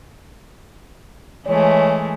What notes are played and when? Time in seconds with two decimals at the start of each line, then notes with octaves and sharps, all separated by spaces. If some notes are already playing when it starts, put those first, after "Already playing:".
1.46 E3 G#3 A3 C#5